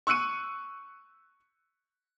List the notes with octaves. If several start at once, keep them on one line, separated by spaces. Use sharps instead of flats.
C#6 E6 F#6 C#7 D#7